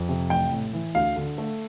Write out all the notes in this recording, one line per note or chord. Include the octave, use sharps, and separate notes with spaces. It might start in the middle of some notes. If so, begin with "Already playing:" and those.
Already playing: F2
C3
A1 G5
A2
E3
D2 F5
D3
A3